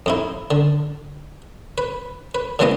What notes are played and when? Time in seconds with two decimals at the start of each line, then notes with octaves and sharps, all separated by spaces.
0.06 F2 D#4 E4
0.51 D3
1.78 B4
2.35 B4
2.59 A#2 C#3 E3 G#3 B3 D#5